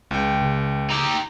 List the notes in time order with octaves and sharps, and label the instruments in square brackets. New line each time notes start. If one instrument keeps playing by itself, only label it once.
[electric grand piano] C#2 G5 [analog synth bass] C#3
[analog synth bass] C#3
[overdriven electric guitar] D#4 G4